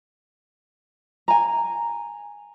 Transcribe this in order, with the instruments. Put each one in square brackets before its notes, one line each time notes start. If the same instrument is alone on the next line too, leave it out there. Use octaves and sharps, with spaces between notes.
[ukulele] G#5 A#5